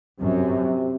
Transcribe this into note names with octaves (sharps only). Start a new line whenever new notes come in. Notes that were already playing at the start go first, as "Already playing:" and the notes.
F#2 C3